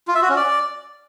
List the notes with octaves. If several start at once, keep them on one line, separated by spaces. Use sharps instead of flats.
F4
E5
F#4
C#4
D5